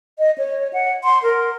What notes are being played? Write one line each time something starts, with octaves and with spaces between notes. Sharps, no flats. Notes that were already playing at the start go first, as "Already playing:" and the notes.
D#5
C#5
F#5
C6
A#4